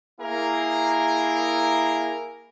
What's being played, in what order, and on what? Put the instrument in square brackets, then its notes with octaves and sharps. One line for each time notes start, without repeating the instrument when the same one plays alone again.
[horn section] A#3 E4 G#4 A#4